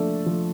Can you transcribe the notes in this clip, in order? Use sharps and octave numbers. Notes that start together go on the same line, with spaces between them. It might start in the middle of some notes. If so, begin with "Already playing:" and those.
Already playing: F3 A3 D4 A4
F3